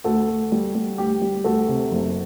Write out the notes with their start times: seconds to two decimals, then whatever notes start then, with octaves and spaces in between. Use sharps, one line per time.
0.04 D2 F#4 A4
0.28 D2
0.52 G3
0.75 G3
0.98 D2 G4
1.22 G3
1.44 D2 F#4 A4
1.68 C3
1.91 F#1